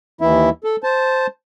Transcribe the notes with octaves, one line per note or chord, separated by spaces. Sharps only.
D#2 E3 E4 E5
A4
C5 A5